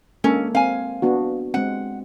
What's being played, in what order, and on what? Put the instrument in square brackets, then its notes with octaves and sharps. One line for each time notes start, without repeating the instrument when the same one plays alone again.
[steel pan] G#3 A#3 A4 [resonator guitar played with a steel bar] C#4
[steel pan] C4 [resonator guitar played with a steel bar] F5 G#5
[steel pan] B3 D4 F#4
[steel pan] G#3 C4 [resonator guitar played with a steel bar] F#5